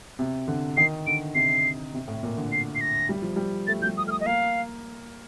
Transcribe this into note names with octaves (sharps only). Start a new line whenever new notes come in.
C3
D3
D#3 C7
D3 D7
C3 C7
C3
A2
A#2
D3
C7
C7
A#6
G3
F3
G3
A3 A6
F3 G6
G3
D#6
A3 F6
D#6
D#5
A#3 F5